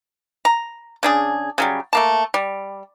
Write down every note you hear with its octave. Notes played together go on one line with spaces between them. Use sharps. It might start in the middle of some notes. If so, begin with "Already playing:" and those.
A#5
C#3 D4 G#4
C#3 F#3 G3
A3 A#3 A5
G3